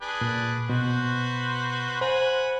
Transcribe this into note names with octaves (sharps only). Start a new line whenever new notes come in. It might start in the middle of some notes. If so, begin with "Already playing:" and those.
D4 G#4 B4
A#2
B2 F#4 B4 C5
C5 F#5 G#5 B5